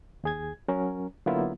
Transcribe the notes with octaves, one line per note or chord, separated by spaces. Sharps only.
D#2 G#4 G#6
F#3 C#4 A#4
D3 F#3 A#3 B3 E4 F4